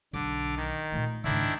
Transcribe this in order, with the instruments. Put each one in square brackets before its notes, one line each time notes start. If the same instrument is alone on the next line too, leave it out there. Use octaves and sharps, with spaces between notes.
[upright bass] B1 [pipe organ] D3 D6
[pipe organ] D#3
[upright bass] A#2 A3
[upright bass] C#2 G#2 [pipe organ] D#3 D4 E4